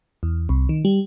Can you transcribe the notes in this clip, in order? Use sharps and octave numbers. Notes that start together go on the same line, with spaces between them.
E2
C2
D#3
G3